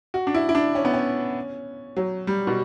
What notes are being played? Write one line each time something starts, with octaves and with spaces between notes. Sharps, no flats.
F#4
D4
E4
E4
D4
C#4
B3
C#4
F#3
G3
B2